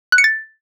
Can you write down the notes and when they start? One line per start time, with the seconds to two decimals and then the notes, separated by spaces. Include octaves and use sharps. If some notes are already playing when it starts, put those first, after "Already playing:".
0.12 F#6
0.18 C#7
0.24 A6